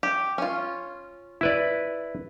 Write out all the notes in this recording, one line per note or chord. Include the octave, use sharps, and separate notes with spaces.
G4
C#4 F4
E4 B4 D5